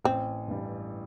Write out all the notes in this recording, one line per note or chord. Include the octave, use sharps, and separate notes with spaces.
A1 C4
G2 E3 G3